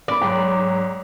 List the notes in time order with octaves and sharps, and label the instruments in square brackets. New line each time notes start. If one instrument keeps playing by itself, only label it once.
[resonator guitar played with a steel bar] D5 [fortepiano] B5 D6
[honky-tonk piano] G#2 [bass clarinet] F#3 [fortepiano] G5